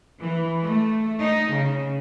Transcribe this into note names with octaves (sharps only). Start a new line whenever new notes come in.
E3
A3
D#4
C#3